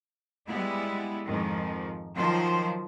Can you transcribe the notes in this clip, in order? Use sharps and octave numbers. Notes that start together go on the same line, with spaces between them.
G3 G#3 B3 E4
F2 G#2 D#3 F3
D#3 F3 F#3 F4 C5